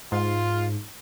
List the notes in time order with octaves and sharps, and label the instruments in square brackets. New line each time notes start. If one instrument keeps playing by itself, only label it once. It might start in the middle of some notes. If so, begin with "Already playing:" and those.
[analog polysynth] G#2 [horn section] F4